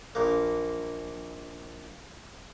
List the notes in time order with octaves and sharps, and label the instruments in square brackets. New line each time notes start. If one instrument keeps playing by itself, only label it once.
[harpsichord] A#1 A#3